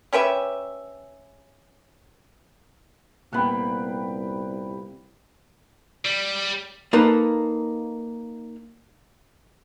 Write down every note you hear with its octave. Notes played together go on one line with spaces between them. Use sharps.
C#4 G4 B4 E5
C2 A#2 B3 G5 B5 F#6
G3
A#3 D#4 A4 B4